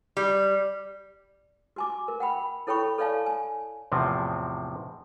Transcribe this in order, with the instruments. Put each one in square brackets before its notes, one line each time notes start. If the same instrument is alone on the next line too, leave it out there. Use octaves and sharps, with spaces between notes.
[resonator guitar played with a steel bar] G3
[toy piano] F#4 G#5 D6
A#4
F#5 G5 B5
E4 A4 C#5 G5 B5 C#6
A4 C#5 D5 F5 G#5 A5
G#5
[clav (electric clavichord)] E2 A2 C3 F3 A#3 C4